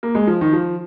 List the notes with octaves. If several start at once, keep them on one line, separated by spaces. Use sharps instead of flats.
A#3
G#3
F3
D#3
F3